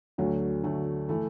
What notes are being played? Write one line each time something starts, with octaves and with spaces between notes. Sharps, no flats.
D2 D3 F#3 A3
D2 D3 F#3 A3
E3 A3